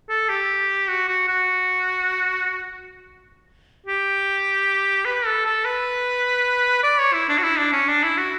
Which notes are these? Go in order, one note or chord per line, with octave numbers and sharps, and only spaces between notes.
A4
G4
F#4
F#4
F#4
G4
B4
A4
A4
B4
D5
C#5
E4
D4
F#4
E4
D4
C#4
D4
E4
F#4